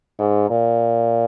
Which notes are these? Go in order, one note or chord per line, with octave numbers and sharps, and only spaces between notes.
G#2
A#2